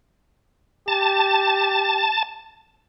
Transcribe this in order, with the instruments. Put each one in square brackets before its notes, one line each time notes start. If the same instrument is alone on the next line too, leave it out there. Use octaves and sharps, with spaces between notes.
[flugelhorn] G4 [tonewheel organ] A5